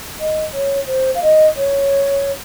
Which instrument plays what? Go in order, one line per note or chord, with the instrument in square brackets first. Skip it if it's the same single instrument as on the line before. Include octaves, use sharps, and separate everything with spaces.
[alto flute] D#5
C#5
C5
F5
D#5
C#5